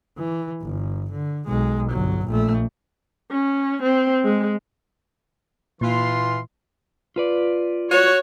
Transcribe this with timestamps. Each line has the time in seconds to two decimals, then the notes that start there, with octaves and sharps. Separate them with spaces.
0.18 E3
0.62 G1
1.13 D3
1.47 B1 G#3
1.91 G1 F#3
2.27 A#1 A3
3.31 C#4
3.82 C4
4.25 G#3
5.81 A#2 E3 F4 C6
7.16 F4 B4 D5
7.91 F#4 C#5